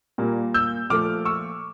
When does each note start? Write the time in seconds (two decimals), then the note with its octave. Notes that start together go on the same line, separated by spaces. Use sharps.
0.18 A#2 G3 A#3
0.54 E6 G6
0.90 A#2 F3 A3 D6 F6
1.25 C#6 E6